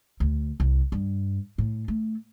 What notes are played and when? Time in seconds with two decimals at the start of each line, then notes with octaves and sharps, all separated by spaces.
0.20 D2
0.60 C2
0.92 G2
1.58 A2
1.88 A3